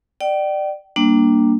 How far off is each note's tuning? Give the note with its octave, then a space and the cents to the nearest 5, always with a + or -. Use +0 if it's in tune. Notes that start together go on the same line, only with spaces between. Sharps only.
D5 +25 G5 -35
G3 +0 A#3 +0 D4 +0